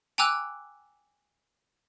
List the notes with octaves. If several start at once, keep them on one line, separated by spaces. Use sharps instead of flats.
G5 G#5 A#5 D6 E6 F#6